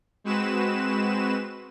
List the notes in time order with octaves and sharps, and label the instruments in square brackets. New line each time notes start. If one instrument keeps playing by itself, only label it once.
[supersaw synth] G#3 C4 F#4 B4 E7